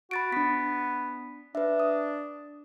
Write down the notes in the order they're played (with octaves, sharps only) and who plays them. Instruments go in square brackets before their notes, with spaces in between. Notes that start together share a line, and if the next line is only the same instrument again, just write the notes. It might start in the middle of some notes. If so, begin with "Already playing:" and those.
[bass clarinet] F#4 [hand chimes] B5 A6 D7
[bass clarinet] B3 [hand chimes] D4 B6
[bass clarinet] D4 [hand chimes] B4 E5
[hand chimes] D#6